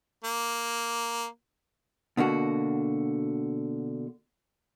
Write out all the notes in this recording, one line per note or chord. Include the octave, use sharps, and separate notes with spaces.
A#3
B2 D3 A#3 F#4